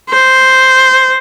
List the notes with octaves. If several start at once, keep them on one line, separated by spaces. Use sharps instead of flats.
C5